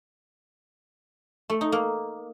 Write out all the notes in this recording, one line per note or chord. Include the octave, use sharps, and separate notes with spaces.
A3
D#4
A#3